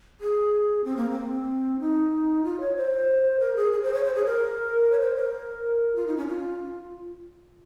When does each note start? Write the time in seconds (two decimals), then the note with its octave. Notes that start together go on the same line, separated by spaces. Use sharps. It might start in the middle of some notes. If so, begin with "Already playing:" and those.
0.21 G#4
0.84 C4
0.97 A#3
1.10 C4
1.80 D#4
2.44 F4
2.60 C#5
2.76 C5
3.40 A#4
3.56 G#4
3.72 G#4
3.83 C5
3.94 C#5
4.04 C5
4.15 G#4
4.26 A#4
4.92 C#5
5.00 C5
5.16 A#4
5.96 F4
6.07 D#4
6.17 C#4
6.27 F4